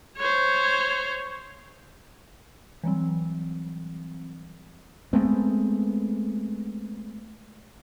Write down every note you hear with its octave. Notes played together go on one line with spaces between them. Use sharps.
C5 C#5
E3 F#3 G3 C4
G#3 A3 B3 C4